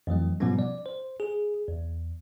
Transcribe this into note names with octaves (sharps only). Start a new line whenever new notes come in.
F2 E3 F#3 A3
G#2 B2 F3 G3 B3 C#4
D5
C5
G#4
E2